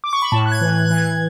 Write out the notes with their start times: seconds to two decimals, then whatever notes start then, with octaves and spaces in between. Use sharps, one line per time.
0.04 D6
0.13 C#6
0.22 B5
0.32 A2 A5
0.46 F#6
0.52 G#6
0.61 E3
0.71 G#6
0.85 F#6
0.90 E3
0.98 G#6